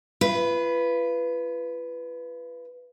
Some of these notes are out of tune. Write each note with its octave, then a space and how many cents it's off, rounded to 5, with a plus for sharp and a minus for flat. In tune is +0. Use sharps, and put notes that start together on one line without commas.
F4 -40 B4 +0